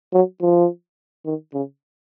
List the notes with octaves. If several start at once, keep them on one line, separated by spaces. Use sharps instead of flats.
F#3
F3
D#3
C#3